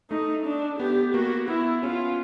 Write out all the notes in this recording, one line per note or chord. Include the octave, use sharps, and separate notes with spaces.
A3 D#4
D4
B3 G4
A#3 F#4
B3 E4
C#4 F4